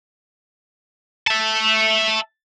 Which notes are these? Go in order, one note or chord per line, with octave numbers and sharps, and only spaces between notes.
E5 A5